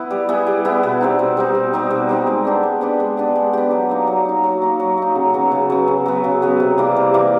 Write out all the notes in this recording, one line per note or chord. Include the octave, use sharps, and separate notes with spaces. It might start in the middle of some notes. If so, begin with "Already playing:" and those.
Already playing: B3 E4
G3
B3 E4 G#4
G3
B3 E4 G#4
B2
G3 C4 D#4
B2
G3 C4 D#4
B2
G3 C4 D#4
B2
G3 C4 D#4
G#3
B3 D4 G4
G#3
B3 D4 G4
G#3
B3 D4 G4
G#3
B3 D4 G4
F#3
A#3 D#4
F#3
A#3 D#4
F#3
A#3 D#4
F#3
A#3 D#4
C#3
F#3 B3
C#3
F#3 B3
C#3
F#3 B3
C#3
F#3 B3
C3
E3 G3 A#3
C3
E3 G3 A#3